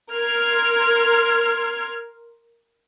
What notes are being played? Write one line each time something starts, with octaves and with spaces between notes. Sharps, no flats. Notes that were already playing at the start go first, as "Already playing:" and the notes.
A#4 C6 F6 G#6